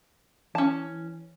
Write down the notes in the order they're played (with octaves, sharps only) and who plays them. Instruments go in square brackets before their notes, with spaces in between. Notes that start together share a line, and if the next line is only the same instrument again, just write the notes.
[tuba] E3 [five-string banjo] C#4 A5